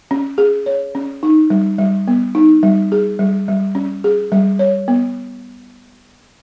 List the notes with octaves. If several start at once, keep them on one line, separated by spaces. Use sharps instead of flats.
C#4
G#4
C#5
C#4
D#4
G3
G3
B3
D#4
G3
G#4
G3
G3
C#4
G#4
G3
C#5
B3